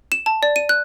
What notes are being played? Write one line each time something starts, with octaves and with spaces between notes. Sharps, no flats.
E7
A5
D5
D#7
F#6